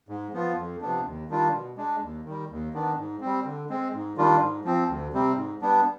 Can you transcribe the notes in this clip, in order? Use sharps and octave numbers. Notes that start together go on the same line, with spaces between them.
G#2
F3 B3 F4
F2
C3 F3 B3 D4
D#2
D#3 G3 D4 F4
B2
G#3 D4
D#2
D#3 G3
D#2
D#3 B3 D4
G#2
G3 C4
D3
G#3 C4
G#2
D#3 G3 D4 F4
G#2
F3 C4
D2
C3 G3 C4
G#2
G3 B3 D4